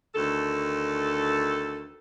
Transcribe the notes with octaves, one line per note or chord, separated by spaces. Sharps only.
D2 D#3 A4